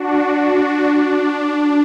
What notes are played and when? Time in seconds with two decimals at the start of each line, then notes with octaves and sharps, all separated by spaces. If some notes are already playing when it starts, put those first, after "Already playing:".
Already playing: D4 F#4
0.24 D4
1.51 D4